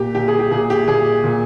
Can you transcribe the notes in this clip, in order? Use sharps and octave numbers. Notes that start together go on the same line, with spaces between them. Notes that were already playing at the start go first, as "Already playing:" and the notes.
Already playing: A#2 G4
A#2 G4
G#4
G4
A#2 G#4
G4
A#2 G#4
A#2